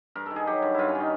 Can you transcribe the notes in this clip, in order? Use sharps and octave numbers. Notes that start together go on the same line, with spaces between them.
G2 A#4
D#3 A4
G#4
F#3 G4
G2
G2 E4 F4
C#4
D#3
D#4